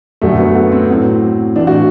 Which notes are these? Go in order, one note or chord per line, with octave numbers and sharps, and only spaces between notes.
F#2 D3 F#3 A3
B3
B3
C4
A2 F#3 C4
A2 E3 D4
F#4